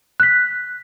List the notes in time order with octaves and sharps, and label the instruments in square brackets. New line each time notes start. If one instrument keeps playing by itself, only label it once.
[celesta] F#6 B6